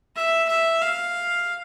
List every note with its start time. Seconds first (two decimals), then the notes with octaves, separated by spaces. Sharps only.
0.16 E5
0.49 E5
0.82 F5